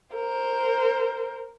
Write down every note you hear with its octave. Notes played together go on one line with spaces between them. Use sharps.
A#4 C5